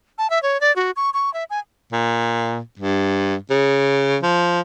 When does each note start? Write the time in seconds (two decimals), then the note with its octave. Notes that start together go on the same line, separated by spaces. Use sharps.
0.18 A5
0.30 E5
0.43 C#5
0.61 D5
0.76 F#4
0.96 C#6
1.14 C#6
1.34 E5
1.50 G#5
1.93 A#2
2.80 G2
3.50 C#3
4.23 F3